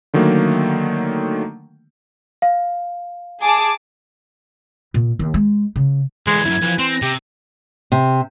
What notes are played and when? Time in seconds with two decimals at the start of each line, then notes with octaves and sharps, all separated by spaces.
0.14 D3 D#3 F#3 A3 A#3
2.42 F5
3.41 G#4 A5 D6
4.94 A#2
5.19 D#2
5.34 G#3
5.76 C#3
6.27 D3 E3 G#3 G#6
6.45 B1 F#2 E4
6.62 F2 E3
6.79 C4 C6
6.91 A#6
7.02 C3 G4
7.92 C3